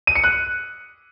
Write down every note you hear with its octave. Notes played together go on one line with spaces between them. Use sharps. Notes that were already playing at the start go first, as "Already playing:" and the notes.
D#7
C#7
F#6